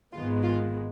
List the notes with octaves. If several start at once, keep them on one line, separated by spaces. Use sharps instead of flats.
G#1 G#2 D#3 G#3 B3 F4
F4